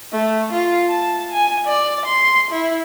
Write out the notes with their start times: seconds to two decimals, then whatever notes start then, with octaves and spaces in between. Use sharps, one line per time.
0.13 A3
0.53 F4
0.89 A5
1.32 G#5
1.67 D5
2.06 C6
2.51 E4